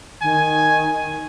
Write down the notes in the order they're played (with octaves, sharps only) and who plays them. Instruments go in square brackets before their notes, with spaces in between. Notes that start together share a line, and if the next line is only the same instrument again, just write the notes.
[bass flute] D#3 [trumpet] G#5